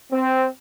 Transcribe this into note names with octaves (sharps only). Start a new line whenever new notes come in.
C4